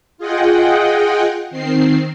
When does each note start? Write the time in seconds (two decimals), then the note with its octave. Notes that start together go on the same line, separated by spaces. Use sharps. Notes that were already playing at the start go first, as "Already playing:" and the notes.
0.18 F4 G#4 D#5 F#5 G5
1.51 D#3 C4 C7